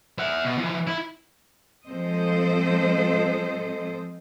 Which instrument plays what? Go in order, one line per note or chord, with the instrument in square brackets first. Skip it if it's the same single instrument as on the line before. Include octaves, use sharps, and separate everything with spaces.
[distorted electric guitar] E5 F#5
B2
E3 F3
E4
[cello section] F3 G#3 C4 A4 C5 D#5